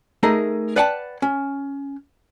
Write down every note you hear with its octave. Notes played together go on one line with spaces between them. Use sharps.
A3 D#4 G#4 A#4
B4 D5 F#5 G5 A5
C#4